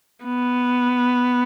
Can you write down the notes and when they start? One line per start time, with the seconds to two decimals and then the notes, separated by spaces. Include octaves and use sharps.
0.25 B3